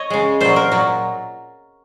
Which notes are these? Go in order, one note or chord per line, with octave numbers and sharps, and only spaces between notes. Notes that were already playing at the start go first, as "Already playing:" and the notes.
Already playing: C#5 D#5
C#3 G#3
A#2 F#3 C5
A#4
A#2 F#3